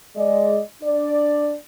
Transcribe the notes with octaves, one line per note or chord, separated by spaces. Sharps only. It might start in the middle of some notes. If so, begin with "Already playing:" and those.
G#3 D5 D#5
D4 D5